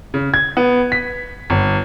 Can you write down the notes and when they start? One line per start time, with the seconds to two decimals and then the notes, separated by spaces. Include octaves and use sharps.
0.14 C#3
0.34 G#6
0.57 B3
0.92 B6
1.50 G1